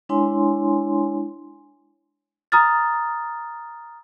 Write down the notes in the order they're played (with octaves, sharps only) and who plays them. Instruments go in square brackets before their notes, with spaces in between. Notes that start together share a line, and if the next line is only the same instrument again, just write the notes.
[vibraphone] G#3 D4 E4 C#5 G#5 C6
[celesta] A#5 D#6 F6 A6